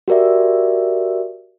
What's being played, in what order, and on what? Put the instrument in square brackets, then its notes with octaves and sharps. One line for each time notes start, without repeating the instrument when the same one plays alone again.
[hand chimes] F#4 G4 A#4 D5 E5